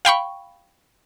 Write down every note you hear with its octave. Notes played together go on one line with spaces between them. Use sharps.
F5 G5 B5 C#6